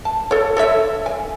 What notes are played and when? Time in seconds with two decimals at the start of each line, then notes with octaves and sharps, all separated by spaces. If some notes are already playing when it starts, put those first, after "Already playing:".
0.05 A5
0.31 A4 C#5
0.57 A4 C#5 E5
1.06 G#5